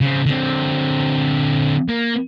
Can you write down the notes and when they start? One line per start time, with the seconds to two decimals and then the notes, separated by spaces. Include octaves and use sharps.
0.01 C#3 C4
0.26 D3 C4
1.88 A#3